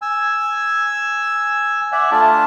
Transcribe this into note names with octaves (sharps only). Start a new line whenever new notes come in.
G#5 E6
D5 E5 F#5 G#5
A3 D4 F4 A5